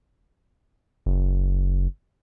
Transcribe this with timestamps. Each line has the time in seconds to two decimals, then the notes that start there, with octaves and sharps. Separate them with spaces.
1.06 F#1